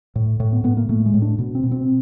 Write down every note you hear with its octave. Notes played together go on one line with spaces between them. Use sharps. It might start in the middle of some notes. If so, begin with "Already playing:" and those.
A2
A2
B3
A2 B3
A#3
A2 A3
G#3
A2
D4
B2
C4
B2
C4